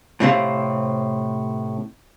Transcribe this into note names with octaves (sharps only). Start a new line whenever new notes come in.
A2 C3 C4 F5